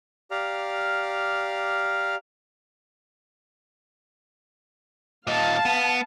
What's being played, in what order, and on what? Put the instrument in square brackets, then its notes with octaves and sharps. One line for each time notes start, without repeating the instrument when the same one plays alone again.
[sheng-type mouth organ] G4 D5 F5 A#5 F6
[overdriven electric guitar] A#2 D#4 [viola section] F5 A5
[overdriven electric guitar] B3